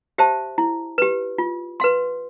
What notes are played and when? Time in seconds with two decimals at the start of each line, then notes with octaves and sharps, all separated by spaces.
0.18 G4 C5 E5 A5
0.58 E4
0.98 G4 B4
1.38 F4
1.80 B4 F5 C6